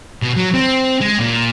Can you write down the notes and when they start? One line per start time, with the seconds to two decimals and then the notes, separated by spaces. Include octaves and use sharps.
0.22 B2
0.36 F#3
0.54 C4
1.00 G#3
1.19 A#2